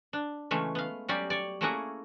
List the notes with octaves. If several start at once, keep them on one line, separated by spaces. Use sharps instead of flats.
D4
C#3 E3 G#3 A3 C#4
B3 F5
F#3 G3 C#4 G4 D5
C#5 D5
A3 A#3 C#4 E4 F#4 G#4